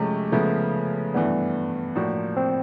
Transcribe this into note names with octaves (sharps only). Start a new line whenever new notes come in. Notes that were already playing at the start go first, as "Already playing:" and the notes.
Already playing: C3 F3 G#3 A3 C#4
C#3 F3 G#3 A3 B3
G2 E3 A3 B3 D4
A2 F3 A#3 D4 F#4
C4